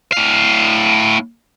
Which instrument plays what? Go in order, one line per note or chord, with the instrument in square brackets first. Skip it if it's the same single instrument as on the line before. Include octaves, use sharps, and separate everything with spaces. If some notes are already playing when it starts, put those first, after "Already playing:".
[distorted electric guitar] A2 F5